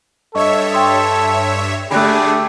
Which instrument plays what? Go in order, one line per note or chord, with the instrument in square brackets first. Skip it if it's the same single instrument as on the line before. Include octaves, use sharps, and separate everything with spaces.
[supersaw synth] G2 C#5 E5 [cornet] A4 [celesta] D#5 A5 C#6
[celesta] G5 C6 D#6
[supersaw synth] D3 D4 G#4 [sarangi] A3 [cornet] G4 [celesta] B5 F#6